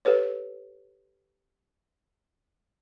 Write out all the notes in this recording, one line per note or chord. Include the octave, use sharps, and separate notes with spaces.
G4 A4 B4 C#5